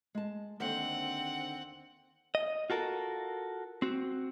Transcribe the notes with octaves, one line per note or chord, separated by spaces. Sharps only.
G#3 A5
D#2 D3 C4 C5 F#5
D#5
F4 F#4 A4 A#4
C4 F#4